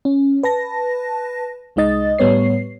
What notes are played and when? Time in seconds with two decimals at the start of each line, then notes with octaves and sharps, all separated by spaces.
0.05 C#4
0.43 B4 A5 A#6
1.76 C2 G#3 D#4 D#5 A6
2.19 A2 G3 B3 C#5 C7